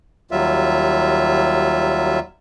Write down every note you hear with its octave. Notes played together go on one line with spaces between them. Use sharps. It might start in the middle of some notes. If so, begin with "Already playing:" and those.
D#2 F#3 G3 F4 E5